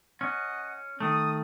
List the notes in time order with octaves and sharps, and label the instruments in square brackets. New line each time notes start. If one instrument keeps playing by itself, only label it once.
[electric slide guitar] C#4 [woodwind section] D#5 F#5
[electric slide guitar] D#3 A3 [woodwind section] D#6